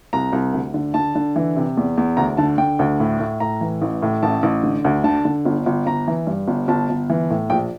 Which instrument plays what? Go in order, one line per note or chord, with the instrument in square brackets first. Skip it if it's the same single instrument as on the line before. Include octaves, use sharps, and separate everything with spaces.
[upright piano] C2 A#5
C2
D2
D3
D3 A5
D3
E3
C3
E2
E2
D2 A#5
D3 A5
D3 G5
D2
A2
A2
A2 A#5
E3
A1
A2
A1 A5
A1
D3
D2
D3 A5
D3
G1
G1
G1 A#5
E3
G2
G1
G1 A5
G1
E3
A2
A#1 G5